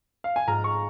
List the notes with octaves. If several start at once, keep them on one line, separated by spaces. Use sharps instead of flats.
F5
G#5
G#2 G#3 F4 A#5
C#6